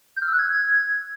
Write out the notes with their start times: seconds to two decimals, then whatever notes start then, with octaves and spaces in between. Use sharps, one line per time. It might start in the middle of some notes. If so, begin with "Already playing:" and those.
0.16 G6
0.22 F6
0.28 E6
0.33 F#6
0.39 G#6